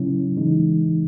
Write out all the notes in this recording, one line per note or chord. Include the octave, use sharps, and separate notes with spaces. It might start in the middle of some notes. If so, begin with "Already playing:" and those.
Already playing: C#3 F#3 C#4 E4
C#3 E3 G#3 D#4